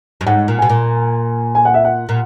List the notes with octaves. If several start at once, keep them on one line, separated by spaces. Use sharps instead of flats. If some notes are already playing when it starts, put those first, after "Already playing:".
F#2
G#2 F#5
A#2
B2 G#5
A#2
G#5
F#5
E5
F#5
A#2